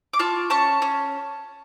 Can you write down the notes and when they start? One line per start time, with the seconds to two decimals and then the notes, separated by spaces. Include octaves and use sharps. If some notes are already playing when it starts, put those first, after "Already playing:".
0.13 D6
0.19 F4 A5 C#6
0.50 C#4 A5 C#6
0.82 C#4